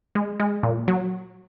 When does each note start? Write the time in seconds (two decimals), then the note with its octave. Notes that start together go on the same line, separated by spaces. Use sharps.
0.15 G#3
0.40 G#3
0.63 A#2
0.88 F#3